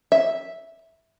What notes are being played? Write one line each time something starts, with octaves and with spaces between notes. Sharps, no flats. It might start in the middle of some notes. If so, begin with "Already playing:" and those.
E5